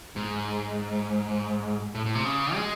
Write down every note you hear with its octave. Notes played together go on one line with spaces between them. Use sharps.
G#2
A2
A2
C3
C#3
G#3